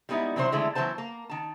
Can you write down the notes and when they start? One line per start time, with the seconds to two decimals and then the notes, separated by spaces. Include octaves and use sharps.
0.09 G3 G#3 B3 D#4 E4
0.36 C3 E3 F#3 D4 E4 C5
0.52 D3 E3 G#3 A3 D4 E4
0.75 E3 F#3 B3 C5 A5
0.98 A#3
1.30 D#3 A5